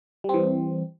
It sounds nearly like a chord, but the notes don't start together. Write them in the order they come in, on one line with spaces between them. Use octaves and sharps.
G3 C4 E3